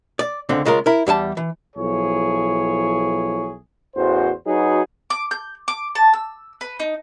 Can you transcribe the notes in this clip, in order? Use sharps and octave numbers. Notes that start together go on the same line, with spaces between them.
D5
C#2 D3 C4
C#3 G#3 F4 A#4
E4 A#4
E2 G3 G4 A5
E3
B1 F3 E4 G#4 C#5
A1 E2 F#4 C5
F#3 D#4 F#4 G#4 B4
D6
G6
D6
A5
E6
B4
D#4